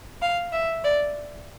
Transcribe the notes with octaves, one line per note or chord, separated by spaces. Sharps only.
F5
E5
D5